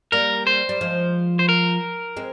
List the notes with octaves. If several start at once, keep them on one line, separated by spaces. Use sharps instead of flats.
G3 A#3 A#4
C5
G3
F3 G#3
C5
A#4
G#3 C4